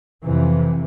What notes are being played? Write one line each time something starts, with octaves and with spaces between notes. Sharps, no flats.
F2 C3 E3